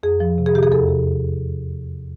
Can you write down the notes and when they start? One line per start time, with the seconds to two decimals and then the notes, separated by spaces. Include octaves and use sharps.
0.03 F2 G#4
0.20 F3
0.38 C3
0.46 G#4
0.55 C3 G4
0.63 G#4
0.72 E2 A4
0.89 C3